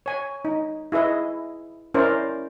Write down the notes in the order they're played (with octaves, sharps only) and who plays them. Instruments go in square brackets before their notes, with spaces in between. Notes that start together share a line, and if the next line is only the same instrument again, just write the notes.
[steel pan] C#5 G#5
D#4
E4 G#4 B4 D#5 E5
C#4 E4 A#4 C5 D5